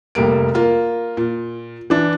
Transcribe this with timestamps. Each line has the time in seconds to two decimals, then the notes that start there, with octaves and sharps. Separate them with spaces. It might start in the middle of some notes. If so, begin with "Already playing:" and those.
0.15 F1 G3 A#3 D7
0.54 A#3 F4 A#4
1.17 A#2
1.90 E3 D4